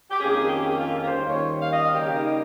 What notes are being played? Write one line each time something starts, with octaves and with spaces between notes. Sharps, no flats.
G4
F2 D#3 A#3 C#4 G#4
G4
F4
A#4
D#2 D#3 G3 C#4 C5
C#5
F5
D#5
C#3 G3 A#3 G4
D#4